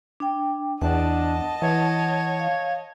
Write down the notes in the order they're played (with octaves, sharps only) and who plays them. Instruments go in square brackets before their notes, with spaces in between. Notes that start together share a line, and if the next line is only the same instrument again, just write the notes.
[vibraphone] D4 G5
[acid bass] E2 [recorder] D4 [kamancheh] D#5 A5 [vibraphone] F#5
[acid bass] E3 [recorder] C#5 [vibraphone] F#5
[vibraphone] F5